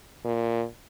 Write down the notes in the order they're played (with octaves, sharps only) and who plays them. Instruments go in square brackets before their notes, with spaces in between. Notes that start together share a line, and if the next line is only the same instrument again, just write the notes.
[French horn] A#2